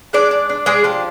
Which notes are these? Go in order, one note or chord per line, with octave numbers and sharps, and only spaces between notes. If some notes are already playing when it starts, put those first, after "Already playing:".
G#3 D4 D5
D4
D4
G#3 D4 G#4
F3 G4